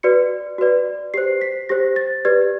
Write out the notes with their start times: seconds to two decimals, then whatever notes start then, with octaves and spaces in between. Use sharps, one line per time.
0.03 F#4 B4 D5 C#7
0.58 F#4 B4 D5
1.14 G4 C5 C7
1.41 B6
1.69 G4 C5 A#6
1.96 A6
2.25 G4 B4 D5 G#6